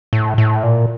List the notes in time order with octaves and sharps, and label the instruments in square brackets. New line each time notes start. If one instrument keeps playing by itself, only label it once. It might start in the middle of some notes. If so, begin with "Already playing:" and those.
[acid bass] A2
A2
A#2